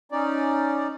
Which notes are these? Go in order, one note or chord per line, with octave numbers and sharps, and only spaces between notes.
C#4 D#4 D5